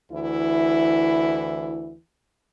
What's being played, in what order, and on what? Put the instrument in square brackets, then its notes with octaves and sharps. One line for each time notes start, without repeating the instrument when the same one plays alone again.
[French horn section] D2 E3 E4